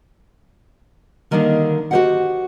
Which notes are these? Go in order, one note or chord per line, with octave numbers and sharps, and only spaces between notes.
D3 D#3 G3 A#3 D4 D#4
F#4 G4 B4 C5 D#5 F#5